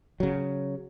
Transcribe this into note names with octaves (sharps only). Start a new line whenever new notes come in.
C#3 F#3